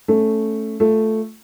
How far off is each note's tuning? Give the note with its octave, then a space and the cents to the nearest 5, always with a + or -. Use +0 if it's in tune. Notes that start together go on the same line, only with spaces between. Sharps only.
A3 +0 C#4 +0
A3 +0 F4 +0